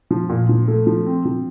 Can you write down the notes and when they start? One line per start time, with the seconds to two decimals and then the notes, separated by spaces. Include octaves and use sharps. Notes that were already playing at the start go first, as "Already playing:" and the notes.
0.11 F3
0.29 A#2
0.49 F3
0.68 A3
0.87 F3
1.06 C4
1.25 F3